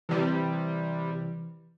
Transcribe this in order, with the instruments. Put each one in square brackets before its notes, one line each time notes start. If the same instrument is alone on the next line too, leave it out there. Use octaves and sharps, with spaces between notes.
[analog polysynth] C3 G3 [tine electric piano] E3